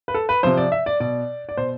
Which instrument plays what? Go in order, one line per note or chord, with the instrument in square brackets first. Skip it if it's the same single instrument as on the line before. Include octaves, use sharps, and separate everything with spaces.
[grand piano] B4
A4
B4
C3 F3 C5
D5
E5
D5
B2 D5
D5
B2 C5